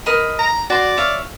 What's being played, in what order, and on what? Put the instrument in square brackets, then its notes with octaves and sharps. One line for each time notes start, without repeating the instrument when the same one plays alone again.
[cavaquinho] A#4 D#5 B5
[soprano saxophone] A#5
[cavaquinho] F#4 C6 [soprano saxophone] D5
[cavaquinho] C#5 E5 F5